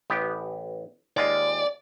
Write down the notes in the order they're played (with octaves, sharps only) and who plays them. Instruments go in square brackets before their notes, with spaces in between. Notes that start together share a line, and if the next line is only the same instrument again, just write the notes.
[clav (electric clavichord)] A1 B3 G4
[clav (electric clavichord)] D#2 G#3 F4 [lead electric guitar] D5